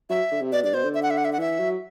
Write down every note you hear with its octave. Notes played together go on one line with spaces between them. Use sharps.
F#3 E5
D3
C3
B2 D5
G2 D5
B2 C5
D3
E5
F#5
E5
F#5
E5
F#5
E3 E5
F#3